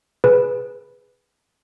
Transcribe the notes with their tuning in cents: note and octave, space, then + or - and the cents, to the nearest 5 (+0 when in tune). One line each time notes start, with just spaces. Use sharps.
G#4 +0 B4 +0